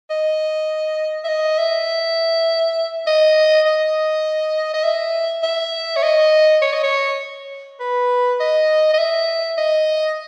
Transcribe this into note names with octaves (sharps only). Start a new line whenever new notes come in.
D#5
E5
D#5
E5
D#5
D#5
D#5
E5
E5
C#5
D#5
C#5
D#5
C#5
B4
D#5
D#5
E5
D#5